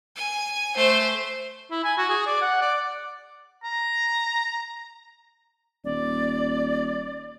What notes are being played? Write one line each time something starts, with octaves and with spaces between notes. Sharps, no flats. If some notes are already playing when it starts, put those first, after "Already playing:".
G#5
A3 C5
E4
G#5
F#4
G#4
D5
F#5
D5
A#5
D#1 D5